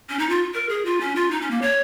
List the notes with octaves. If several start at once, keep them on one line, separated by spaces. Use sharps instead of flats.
C#4
D#4
F4
A#4
G#4
F4
C#4
F4
D#4
C#4
A#3
C#5